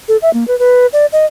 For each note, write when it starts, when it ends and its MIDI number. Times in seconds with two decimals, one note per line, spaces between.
0.08 0.17 69
0.22 0.32 76
0.33 0.46 58
0.48 0.58 71
0.59 0.86 71
0.93 1.06 74
1.12 1.26 75